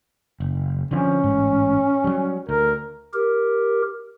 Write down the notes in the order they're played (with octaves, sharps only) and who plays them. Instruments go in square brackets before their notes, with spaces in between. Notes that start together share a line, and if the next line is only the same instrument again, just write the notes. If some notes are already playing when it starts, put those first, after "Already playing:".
[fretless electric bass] F#1
[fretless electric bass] D3 F3 C4 [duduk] C#4
[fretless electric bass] A1 G#2
F#3 G3
[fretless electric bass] D2 [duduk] A#4
[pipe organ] G4 A#4